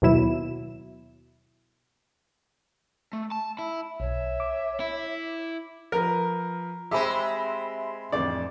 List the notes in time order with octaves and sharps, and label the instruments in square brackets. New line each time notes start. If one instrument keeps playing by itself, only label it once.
[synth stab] D#2 B2 F#3 E4 E7
[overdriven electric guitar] A3
A5
E4
[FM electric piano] B1 [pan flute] C#5 [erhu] E5
[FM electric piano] D6
[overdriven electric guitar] E4
[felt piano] F3 B4 [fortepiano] A#4
[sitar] G#3 C4 [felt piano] G4 D6 [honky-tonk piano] E5 B5
[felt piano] A1 F2 D3 [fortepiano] D5